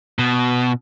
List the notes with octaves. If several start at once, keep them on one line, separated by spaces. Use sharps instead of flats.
B2